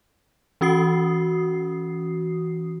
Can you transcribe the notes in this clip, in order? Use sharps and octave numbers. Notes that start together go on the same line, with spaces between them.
E3 C#4 F#4 D#6 C7